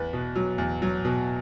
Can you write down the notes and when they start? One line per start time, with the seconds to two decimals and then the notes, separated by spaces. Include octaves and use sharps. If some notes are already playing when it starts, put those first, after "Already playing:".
Already playing: E2 B4
0.13 B2
0.35 F#3
0.58 E2
0.82 F#3
1.05 B2